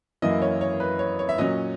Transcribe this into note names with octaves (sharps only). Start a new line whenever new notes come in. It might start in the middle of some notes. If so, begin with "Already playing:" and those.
F#2 E3 A#3 E4 D#5
C#5
C#5
B4
C#5
C#5
E5
A#2 F#3 C#4 D#5